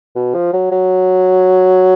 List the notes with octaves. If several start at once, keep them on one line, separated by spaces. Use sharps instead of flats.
B2
F3
F#3
F#3